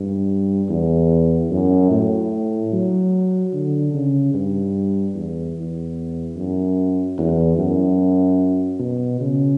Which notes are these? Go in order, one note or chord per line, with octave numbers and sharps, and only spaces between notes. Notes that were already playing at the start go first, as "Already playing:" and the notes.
Already playing: G2
E2
F#2
A2
F#3
D3
C#3
G2
E2
E2
F#2
E2
F#2
B2
C#3